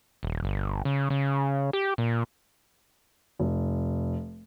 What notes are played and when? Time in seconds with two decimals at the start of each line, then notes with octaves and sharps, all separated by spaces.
0.23 D#1
0.44 G1
0.85 C#3
1.10 C#3
1.73 G4
1.98 A#2
3.39 F1